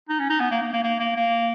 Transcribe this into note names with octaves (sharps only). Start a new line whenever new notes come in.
D#4
C#4
D#4
B3
A#3
A#3
A#3
A#3
A#3
A#3